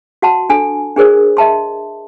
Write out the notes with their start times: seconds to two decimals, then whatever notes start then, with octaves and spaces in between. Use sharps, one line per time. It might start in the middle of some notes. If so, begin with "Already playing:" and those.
0.22 F#4 F#5 A5 C6
0.50 D4 A4 G#5
0.96 D4 G#4 A#4 C5 D5
1.37 D#5 E5 A5 C6